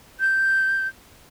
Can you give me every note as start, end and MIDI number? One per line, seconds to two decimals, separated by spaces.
0.20 0.88 91